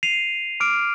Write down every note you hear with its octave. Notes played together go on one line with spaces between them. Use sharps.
C7 D#7 F7
D6 F6 D7